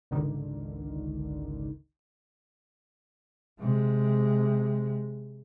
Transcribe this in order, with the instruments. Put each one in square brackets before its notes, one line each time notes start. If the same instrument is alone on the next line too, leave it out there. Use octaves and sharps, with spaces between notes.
[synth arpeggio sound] G#1 C#2 D3 D#3
[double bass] C3 G#3